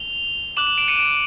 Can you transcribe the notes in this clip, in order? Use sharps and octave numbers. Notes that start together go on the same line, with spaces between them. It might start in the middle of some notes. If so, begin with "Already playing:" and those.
Already playing: F7 G7
D6 F#6 E7 F#7
E7 F#7
D7 E7
C#7 D#7
D7 E7